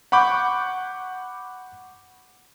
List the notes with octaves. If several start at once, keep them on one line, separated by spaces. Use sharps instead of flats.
F#5 B5 C#6 D6 G6